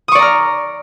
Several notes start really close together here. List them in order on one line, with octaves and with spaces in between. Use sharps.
D#6 C#6 D5 A#5 F6